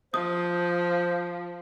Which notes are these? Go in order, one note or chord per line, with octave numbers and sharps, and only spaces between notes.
F3 C5 D#6